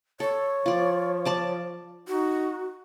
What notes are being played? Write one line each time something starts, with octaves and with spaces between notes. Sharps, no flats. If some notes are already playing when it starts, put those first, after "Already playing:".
A4 C#5
F3 F4 D5
D5 A5 D6
D#4 F#4